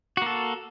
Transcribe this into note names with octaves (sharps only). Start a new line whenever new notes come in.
A#3 F#4 A4